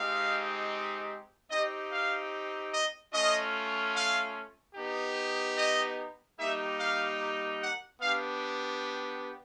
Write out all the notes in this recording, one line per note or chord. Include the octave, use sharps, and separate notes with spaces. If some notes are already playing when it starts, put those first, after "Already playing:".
Already playing: G#3 C4 D#4 G4 F5
C4 D#4 G4 D#5
F5
D#5
A3 C#4 F4 D#5
F5
B3 D#4 G4
D#5
G3 A#3 D#4 G4 E5
F5
F#5
B3 D4 G4 F5